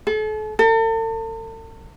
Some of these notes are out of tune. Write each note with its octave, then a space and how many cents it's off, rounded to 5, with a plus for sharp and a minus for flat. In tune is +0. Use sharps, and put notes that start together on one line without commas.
A4 -40
A4 +40